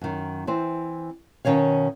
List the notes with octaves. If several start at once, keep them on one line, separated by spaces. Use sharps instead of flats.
F#2 D#3
E3 C4 C5
B2 D#3 C#4 C#5 F5